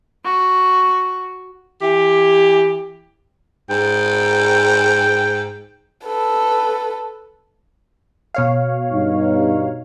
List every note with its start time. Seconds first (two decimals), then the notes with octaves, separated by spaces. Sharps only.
0.24 F#4
1.82 E3 G4
3.70 G#2 G5
6.05 A4 B4
8.34 B2 C#5 F5
8.92 G2 D#4